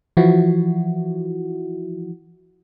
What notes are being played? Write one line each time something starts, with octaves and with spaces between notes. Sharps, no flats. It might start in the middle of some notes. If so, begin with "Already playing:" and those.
E3 F3 E4 F#4